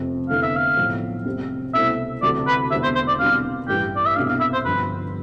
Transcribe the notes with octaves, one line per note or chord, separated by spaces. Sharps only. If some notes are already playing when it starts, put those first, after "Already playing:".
Already playing: F1 F2 C3
F1 E2 D3 A3 E4 F5
E5
F5
B1 A2 F3
F2 C3 G3 C4
C2 B2 A3 C4 E4 E5
D2 C3 E3 A3 D5
B4
E1 E2 D3 G3 C4 E5
C5
C5
D5
C2 B2 G3 D4 F5
A1 G2 E3 G3 G5
D5
E5
C2 B2 A3 D4 F5
F5
E5
C5
G1 G2 F3 B4